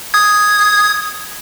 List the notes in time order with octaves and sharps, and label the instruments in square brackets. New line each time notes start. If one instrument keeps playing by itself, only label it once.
[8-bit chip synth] D#6 G#6